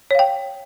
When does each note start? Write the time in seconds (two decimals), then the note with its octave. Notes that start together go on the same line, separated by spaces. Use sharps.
0.11 C#5
0.15 F5
0.19 G5